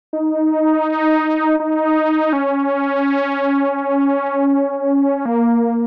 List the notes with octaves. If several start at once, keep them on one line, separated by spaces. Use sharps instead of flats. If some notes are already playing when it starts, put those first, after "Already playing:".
D#4
D#4
C#4
A#3